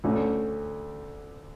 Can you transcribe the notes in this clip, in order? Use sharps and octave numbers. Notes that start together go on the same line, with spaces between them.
D2 D3 A3 C#4